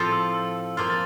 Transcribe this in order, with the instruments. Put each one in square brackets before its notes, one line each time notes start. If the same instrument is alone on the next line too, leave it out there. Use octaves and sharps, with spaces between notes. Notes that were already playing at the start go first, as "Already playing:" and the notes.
Already playing: [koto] A2 F3 C4 F4 A4
[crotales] E6
E6
[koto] F3 A#3 F4 [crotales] F6
[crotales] A6